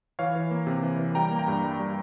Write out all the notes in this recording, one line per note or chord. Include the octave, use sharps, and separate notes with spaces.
E3 C#5 F5
E3
A#3
C3
E3
E3
G3 G5 A#5
A#3
G5 A#5
G2
G3
G3